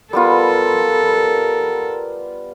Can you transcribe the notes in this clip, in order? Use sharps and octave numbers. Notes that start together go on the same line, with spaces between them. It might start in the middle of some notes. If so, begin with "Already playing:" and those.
G3 B3 F4 A4 A#4